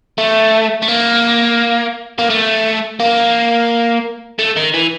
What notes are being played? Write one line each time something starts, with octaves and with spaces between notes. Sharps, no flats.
A3
A3
A#3
A#3
A3
A#3
A3
D#3
E3